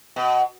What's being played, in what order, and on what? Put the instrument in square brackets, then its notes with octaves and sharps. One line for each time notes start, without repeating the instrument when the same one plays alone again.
[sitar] B2